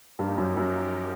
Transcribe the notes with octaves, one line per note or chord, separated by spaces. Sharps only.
G2 F3 A#3 D#4 G4 A#4
F#2
F#2